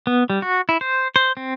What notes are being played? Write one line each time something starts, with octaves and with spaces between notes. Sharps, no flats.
B3
G3
F#4
E4
C5
C5
C4